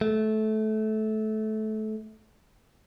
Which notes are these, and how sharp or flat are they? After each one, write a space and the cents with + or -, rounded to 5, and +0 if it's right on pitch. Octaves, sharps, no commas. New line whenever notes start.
A3 -20